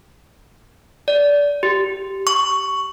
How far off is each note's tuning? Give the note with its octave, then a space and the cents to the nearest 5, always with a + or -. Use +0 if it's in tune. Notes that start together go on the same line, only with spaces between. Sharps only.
D5 -20
G4 -20
C#6 +5